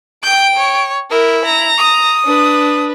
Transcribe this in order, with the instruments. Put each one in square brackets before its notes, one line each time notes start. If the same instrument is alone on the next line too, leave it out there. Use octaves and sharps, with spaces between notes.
[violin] G5 D7 [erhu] G6
[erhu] C#5
[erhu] E4 [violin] A#4
[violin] A#5
[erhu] D#6
[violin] D4 B4